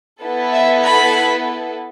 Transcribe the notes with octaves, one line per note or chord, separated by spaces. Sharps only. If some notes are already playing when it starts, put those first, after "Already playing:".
B3 E4 A4
E5
B5